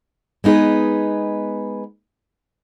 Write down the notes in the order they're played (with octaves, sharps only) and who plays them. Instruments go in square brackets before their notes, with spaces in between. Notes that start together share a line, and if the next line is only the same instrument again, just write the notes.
[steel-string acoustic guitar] G#3 B3 D#4 G#4 B4